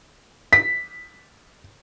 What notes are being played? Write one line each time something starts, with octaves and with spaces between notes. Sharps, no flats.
B6